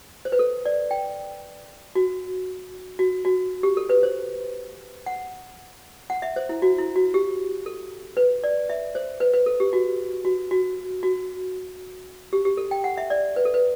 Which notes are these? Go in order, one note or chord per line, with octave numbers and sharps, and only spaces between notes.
C5
B4
A4
D5
G5
F#4
F#4
F#4
G4
A4
B4
C5
F#5
F#5
E5
C5
E4
F#4
E4
F#4
G4
A4
B4
D5
E5
C5
B4
B4
A4
G4
F#4
F#4
F#4
F#4
G4
G4
A4
G5
F#5
E5
D5
B4
A4
B4